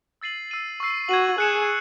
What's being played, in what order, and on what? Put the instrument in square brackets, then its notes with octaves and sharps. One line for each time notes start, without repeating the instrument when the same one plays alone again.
[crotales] E6 A6 C7 D#7 F#7
E6 C7 D#7 F#7
C#6 E6 C7
[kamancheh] F#4 [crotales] G#6 D#7 F#7
[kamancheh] G#4 [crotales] F#6 C#7 E7